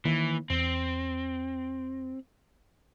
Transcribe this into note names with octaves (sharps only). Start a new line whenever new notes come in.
D#3 E3 A#3
E2 C4